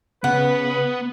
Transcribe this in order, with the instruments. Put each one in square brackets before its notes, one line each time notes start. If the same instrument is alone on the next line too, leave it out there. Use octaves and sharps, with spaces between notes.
[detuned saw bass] C#3 [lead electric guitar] B3 [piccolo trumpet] B4 [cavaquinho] F#5